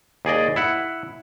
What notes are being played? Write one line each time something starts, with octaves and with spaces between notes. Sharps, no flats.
D#2 G#4 D5 D#5
E4 F#5